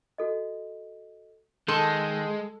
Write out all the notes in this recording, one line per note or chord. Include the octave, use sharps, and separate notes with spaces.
F#4 A4 D#5
D#3 G#3 A4 C6